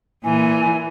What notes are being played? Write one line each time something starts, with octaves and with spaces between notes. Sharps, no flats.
A#2 E3 G#5